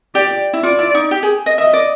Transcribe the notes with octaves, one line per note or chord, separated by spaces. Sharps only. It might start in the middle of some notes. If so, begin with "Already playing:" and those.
G4 D5
E4
F4 D5
E4
D#4
G4
G#4
D#5
D#5 E5
D5